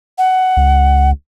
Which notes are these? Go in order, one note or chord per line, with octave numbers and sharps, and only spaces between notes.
F#5
C#2